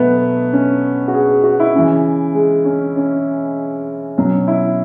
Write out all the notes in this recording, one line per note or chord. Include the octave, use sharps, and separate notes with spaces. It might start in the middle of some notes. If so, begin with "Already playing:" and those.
Already playing: B2 F#3 A3 B3
C#4
F#4
G#4
G#4
F#4
E4
C#3 E3
G#3
C#4
C#4
B2 F#3 C#4
E4